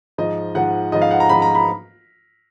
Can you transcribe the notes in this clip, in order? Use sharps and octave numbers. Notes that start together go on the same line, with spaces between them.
G#2 F3 D#5
G#2 F3 F#5
G#2 F3 D#5
F5
F#5
A#5
G#2 F3 B5
A#5
B5